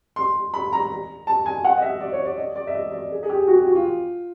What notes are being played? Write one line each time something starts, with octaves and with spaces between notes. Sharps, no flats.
C6
B5
A#5
A5
G#5
F#5
D#5
E5
D5
C#5
D5
D#5
D5
E5
D#5
D5
G#4
G#4
G4
F#4
G4
F#4
F4